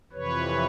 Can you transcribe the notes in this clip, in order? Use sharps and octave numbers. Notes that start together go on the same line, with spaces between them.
F2 C3 E3 B4 C#5